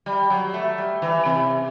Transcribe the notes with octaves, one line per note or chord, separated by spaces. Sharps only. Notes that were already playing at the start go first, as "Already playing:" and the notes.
G3
F#3
A3
G3
E3
C3